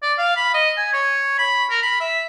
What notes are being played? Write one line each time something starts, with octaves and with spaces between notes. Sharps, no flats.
D5
F5
B5
D#5
G#5
C#5
B5
A#4
B5
E5